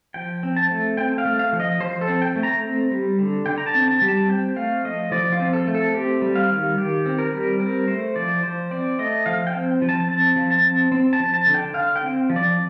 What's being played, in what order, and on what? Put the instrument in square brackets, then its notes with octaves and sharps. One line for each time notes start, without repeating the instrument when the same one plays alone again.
[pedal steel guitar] F3 G5
C4
A5
A3
C4 G5
F5
A3
F5
F3
D#5
F3 C5
A4
C4
G5
A3
A#5
C4
G3
D3
D3 G5
A#5
A5
C4
A5
G3
A5
C4 G5
A3 F5
F3 D#5
F3 D5
F4
C4
A4
A3
A4
C4 G4
G3
F5
D#3
D#3 G4
C4
A#4
G3
C4 A#4
A3 C5
F3 D5
F3 C5
C4 D5
A3 D#5
F3 F5
G5
C4
F3
A5
C4 A5
F3
A5
C4
C4
A5
F3
A5
D3
G5
D3 F5
G5
C4
F3
D5